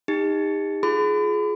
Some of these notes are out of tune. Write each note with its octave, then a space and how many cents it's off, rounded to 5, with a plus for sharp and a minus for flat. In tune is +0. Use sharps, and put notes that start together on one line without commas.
D#4 +0 G4 +40
F4 +5 G#4 +20 B5 +40